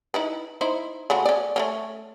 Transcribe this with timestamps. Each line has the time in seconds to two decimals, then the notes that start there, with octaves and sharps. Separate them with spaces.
0.14 D#4 E4 B4
0.61 D#4 E4 C5
1.10 C#3 A3 F#4
1.26 C#4 D5
1.56 A3 A#3 C#4